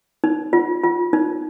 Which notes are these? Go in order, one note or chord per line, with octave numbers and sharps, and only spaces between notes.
D#4
F4
F4
D#4